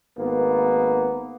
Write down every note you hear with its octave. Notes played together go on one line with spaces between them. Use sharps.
G#1 A#3 B3